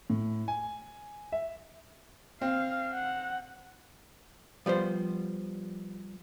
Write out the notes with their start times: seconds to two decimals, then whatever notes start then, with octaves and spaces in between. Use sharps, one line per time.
0.10 A2
0.48 G#5
1.32 E5
2.41 C4 F5
2.93 F#5
4.66 F3 G3 B3 C5